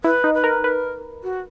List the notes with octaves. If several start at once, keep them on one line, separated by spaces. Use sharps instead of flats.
E4 B4
D#4
B4
A#4
A#4 B4
F#4